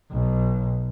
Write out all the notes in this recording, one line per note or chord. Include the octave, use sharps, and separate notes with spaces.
B1